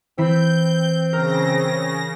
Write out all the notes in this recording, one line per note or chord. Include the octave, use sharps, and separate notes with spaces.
E3 C4 E4 B5 G6
C#3 A#4 A#6